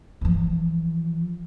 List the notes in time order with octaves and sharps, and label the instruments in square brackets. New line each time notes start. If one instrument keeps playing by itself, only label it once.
[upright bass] E3 F3